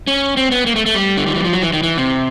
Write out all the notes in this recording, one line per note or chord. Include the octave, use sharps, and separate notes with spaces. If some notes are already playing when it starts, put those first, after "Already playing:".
C#4
C4
B3
A#3
A3
A3
G3
D3
D#3
E3
F3
F#3
E3
D#3
E3
C3